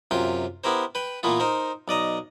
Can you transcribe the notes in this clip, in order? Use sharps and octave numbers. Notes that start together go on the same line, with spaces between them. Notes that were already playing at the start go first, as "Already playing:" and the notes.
F#2 C3 F4 G5
B3 E4 G4 A#4 C5
B4 G5
A#2 E3 A#3 B3 F4
D#4 A#4 C5
B1 D5 D#5 A#5